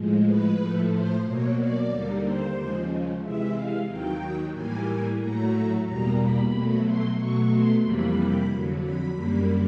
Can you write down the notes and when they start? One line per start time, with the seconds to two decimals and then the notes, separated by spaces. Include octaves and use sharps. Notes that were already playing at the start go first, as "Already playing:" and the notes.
Already playing: A2 F3 G#3
0.25 B4
0.58 A2 F3 A3
0.91 C5
1.24 B2 F#3 A#3 C#5
1.57 D5
1.90 D#2 D3 G3 A#3
2.22 C5
2.56 D#2 C#3 F3 G#3
3.22 C3 E3 G#3 E5
3.54 F5
3.88 D#2 D#3 F#3 G5
4.53 A2 E3 G3 A#3 G#5
5.19 A2 F#3 A3 A#5
5.84 E2 B2 G3 A#3 A#5
6.18 B5
6.50 B2 F#3 A3
6.84 C6
7.17 B2 F#3 A3 C#6
7.50 C6
7.82 F2 C3 E3 G3 A#3 B5
8.49 F2 D3 F#3
8.81 B5
9.14 F#2 D3 G3 A#3